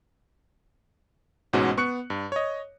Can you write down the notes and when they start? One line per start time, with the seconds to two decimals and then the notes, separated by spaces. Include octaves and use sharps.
1.53 A1 G#2 B2 G#3 C#4 F#4
1.77 B3 C#6 F#6 C#7
2.10 G2
2.32 C#5 D#5